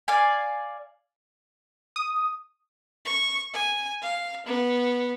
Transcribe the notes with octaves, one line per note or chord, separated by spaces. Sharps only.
D5 F5 G#5
D#6
C#6
G#5
F5
B3